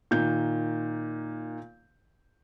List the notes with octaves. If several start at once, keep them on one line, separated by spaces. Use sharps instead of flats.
A#2 D#3 G6